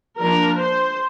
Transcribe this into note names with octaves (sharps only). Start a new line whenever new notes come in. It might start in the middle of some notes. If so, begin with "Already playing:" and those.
F3 A#3 D4 A#4
C5